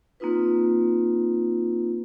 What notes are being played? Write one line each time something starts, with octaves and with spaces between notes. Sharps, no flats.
A#3 C4 D#4 F4 B4